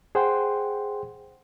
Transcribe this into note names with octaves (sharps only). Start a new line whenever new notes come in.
G#4 C5 F#5 G5 C6